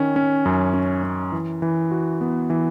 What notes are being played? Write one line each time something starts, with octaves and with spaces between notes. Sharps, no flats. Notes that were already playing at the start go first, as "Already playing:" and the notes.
Already playing: D#3 C#4
C#4
F#2
C#4
C#4
E3
E3
F#4
B3
E3